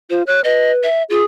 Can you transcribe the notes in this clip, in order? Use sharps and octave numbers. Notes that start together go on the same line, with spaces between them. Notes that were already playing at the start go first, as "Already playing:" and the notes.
F4 C5
C#5 F#6
B4 D#5
E5
F4 G#4